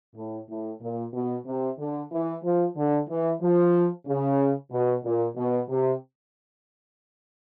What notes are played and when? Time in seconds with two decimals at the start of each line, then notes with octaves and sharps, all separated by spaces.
0.15 A2
0.49 A2
0.81 A#2
1.13 B2
1.46 C3
1.78 D3
2.11 E3
2.43 F3
2.76 D3
3.09 E3
3.42 F3
4.06 C#3
4.71 B2
5.04 A#2
5.36 B2
5.69 C3